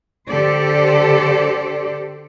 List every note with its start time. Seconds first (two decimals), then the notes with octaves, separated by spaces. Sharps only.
0.29 D3 G4 A4 C5 D5